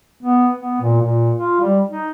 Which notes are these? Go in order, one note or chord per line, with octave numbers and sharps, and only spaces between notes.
B3
B3
A#2
A#2
F4
G3
D#4